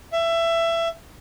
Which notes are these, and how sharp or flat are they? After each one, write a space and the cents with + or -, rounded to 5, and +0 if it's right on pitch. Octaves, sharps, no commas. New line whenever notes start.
E5 +20